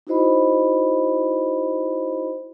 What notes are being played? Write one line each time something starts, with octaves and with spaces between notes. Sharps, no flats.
D#4 E4 F#4 C5 D#5 B5